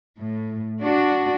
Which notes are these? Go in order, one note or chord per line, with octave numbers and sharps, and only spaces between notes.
A2
D4 F#4